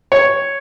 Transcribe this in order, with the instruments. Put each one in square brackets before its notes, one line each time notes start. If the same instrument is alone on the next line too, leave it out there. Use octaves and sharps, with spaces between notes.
[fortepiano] C#5